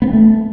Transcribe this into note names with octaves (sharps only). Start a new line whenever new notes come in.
B3
C4
A3